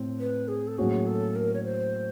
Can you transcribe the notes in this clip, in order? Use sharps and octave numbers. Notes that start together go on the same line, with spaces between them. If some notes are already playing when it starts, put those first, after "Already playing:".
Already playing: A2 C4
B4
G#4
A4
A2 F#3 A#3 C#4 F#4 G#4
A4
A#4
C#5
C5